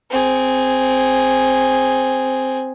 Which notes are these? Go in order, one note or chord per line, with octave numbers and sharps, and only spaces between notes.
C4 G#4